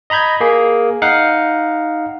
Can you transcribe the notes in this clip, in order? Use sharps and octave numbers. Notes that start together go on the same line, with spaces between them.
D#5 A#5 B5 G6 G#6
A#3 G#4
D#4 F5 F#5 F#6